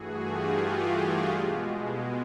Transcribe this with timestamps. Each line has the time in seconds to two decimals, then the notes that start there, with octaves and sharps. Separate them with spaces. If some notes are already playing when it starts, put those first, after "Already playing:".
Already playing: G2 E3 A3 F#4 G#4
0.16 F4 G4
0.54 F#4
1.29 B2 G#3